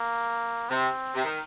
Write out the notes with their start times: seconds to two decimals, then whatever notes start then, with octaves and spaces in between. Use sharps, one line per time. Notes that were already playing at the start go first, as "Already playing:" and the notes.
Already playing: A#3
0.70 C3 C4
1.15 C3
1.24 D#3